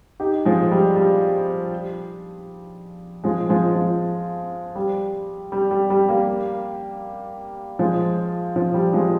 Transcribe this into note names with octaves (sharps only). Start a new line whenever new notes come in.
D#4 G4
F3 G#3
G3
G3
F3 G#3
F3 G#3
F3
G3
G3
G3
G3
G3 A#3
F3 G#3
F3
G3
F3 G#3